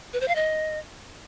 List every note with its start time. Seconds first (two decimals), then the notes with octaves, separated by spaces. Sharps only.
0.13 B4
0.21 C5
0.28 F5
0.35 D#5